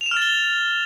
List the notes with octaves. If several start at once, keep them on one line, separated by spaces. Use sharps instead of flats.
F7
E7
F6
A6
G7